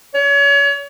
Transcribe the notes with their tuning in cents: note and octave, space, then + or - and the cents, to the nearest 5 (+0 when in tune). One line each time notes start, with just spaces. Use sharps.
C#5 +35